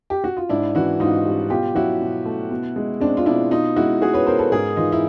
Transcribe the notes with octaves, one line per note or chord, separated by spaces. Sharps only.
G4
F#4
F4
G#2 D4 E4
E3 E4 F#4
G#2 D#4 F4
G3
B2 F4 G4
F#3 E4 F#4
B2
A3
B2
G#3
G#3 C4 D4
F4
B2 D4 E4
B2 D#4 F4
G#3 E4 F#4
G#3 F#4 G#4
B4 C#5
B2 A#4 C5
A4 B4
G#2 G#4 A#4
E3 D#4 F4
E4